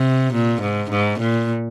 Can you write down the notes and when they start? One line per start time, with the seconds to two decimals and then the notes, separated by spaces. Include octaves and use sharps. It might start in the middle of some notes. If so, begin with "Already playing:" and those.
Already playing: C3
0.33 A#2
0.61 G#2
0.90 G#2
1.19 A#2